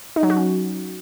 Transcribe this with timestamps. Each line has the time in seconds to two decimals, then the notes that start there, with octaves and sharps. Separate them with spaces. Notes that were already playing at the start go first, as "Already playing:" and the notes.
0.16 D#4
0.23 F#3
0.30 F#4
0.37 C#4